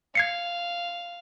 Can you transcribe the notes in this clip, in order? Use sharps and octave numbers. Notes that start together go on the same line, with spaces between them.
F5 G#6 C7 C#7